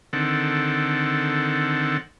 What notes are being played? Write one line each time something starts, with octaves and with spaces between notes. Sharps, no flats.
D3 D#3 C4 A4 F#5